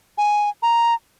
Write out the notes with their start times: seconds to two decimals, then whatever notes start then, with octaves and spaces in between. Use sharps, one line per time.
0.18 G#5
0.63 A#5